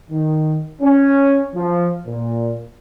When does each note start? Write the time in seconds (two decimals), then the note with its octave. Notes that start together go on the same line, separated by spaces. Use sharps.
0.11 D#3
0.82 C#4
1.55 F3
2.07 A#2